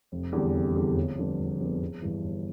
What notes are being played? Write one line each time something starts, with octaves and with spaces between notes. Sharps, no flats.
F1
E2 D3 G3
F1
E2 D3 G3
G1
F2 D3 G3 B3
G1
F2 D3 G3 B3
G1
G2 E3
G1